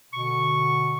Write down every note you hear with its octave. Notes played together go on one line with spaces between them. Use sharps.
B2 D3 C#6